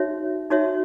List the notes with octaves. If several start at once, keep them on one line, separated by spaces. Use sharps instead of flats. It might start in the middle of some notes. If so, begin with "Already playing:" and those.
Already playing: D#4 F#4 C#5 E5
D#4 F#4 C#5 E5